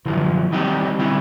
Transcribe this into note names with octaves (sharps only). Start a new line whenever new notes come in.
F#2 D3 E3 F3
D#3 G3 C4 D#4 G4
D3 G3 C4 E4